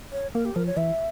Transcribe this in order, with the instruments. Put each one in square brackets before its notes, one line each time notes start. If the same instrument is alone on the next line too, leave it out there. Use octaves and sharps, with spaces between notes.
[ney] C#5
[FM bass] A#3 [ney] A#4
[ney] G4
[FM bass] F3 [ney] A#4
[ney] C#5
[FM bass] E3 [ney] E5